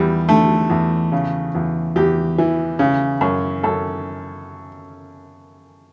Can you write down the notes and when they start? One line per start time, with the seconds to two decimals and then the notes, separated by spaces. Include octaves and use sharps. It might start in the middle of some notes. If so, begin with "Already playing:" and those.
Already playing: E2 G3
0.28 D3 A3
0.70 E2
1.12 C#3
1.55 E2
1.96 E2 G4
2.38 E3
2.79 C#3
3.21 F#2
3.63 F#2 A4